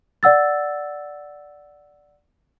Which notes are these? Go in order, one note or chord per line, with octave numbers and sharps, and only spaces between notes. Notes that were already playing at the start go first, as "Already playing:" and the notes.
D5 F#5 E6 A6